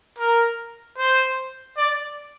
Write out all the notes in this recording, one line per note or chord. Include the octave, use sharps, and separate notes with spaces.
A#4
C5
D5